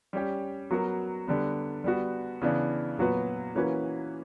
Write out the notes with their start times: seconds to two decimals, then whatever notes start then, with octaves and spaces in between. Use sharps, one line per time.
0.13 G3 C#4 G4
0.71 F#3 B3 F#4 A#4
1.28 D3 G3 B3
1.84 G3 B3 F#4
2.42 C#3 E3 B3 D4
2.98 A#2 F#3 B3 F#4 B4
3.55 E3 A#3 C#4 F#4 B4